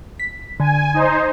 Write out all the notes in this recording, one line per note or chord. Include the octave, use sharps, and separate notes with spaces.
B6
D3 G#5
D#4 C5